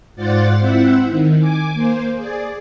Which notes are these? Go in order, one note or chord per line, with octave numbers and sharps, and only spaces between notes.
G#2 F4 C5 D5 F#5 A6
C4 E4 C5 E5 F#5
D#3
G#5 D6
A#3 C5
G#4 D5